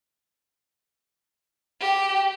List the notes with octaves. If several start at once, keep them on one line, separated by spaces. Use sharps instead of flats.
G4